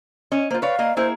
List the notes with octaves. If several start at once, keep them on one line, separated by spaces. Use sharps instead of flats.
C#4 D#5
A#3 F4 C5
B4 C#5 D5 F5
A#3 D#5
A#3 E4 G#4 C5